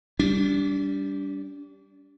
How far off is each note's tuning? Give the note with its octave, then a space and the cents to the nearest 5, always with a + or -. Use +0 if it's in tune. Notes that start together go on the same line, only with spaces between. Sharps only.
G3 +0 D4 -35